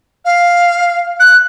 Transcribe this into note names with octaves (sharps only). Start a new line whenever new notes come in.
F5
F#6